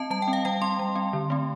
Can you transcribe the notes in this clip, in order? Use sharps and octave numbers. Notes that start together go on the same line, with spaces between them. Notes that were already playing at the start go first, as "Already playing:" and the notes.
Already playing: C4 D#5 A5
G3 A5
G5
C4
F5
G3 G5
C4 C6
G3
C4
D3
A3 C4